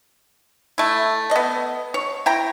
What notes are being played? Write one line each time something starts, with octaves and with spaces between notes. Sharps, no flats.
A3 E4
B3 D#5
C#5
E4 G5 A#5